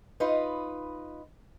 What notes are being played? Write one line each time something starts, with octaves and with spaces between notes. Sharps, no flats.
D#4 F4 B4 D#5